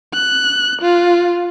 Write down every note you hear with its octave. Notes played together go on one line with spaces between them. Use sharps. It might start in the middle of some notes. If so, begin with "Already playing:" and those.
F#6
F4